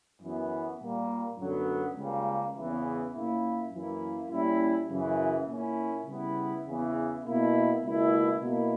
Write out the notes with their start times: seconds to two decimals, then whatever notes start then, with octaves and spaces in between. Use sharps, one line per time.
0.21 F#2 E3 B3
0.79 A#2 G3 A#3
1.37 F#2 D3 F#3 B3
1.97 C#2 C#3 G3 A#3
2.55 E2 C#3 E3
3.14 A#2 A#3 C#4 E4
3.72 F#2 E3 A#3 E4
4.30 A#2 G3 C#4 E4
4.89 F#2 C#3 E3
5.48 A#2 A#3 C#4 E4
6.06 C#3 G3 B3 E4
6.65 E2 C#3 E3
7.24 B2 A#3 E4
7.83 C#2 B2 A#3 E4
8.41 B2 A#3 E4